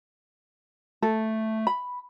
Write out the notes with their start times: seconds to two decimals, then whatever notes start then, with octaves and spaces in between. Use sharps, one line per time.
1.02 A3 A4
1.67 B5